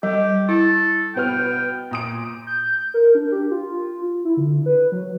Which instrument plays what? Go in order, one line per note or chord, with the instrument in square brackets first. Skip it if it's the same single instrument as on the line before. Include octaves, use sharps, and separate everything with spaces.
[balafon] G3 [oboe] G4
[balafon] E4 [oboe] A4
[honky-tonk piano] B2 B3 F6 [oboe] G5
[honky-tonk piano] A#2 D#6 D7
[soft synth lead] G6
A#4
D4
G4
F4
E4
D3
B4
F#3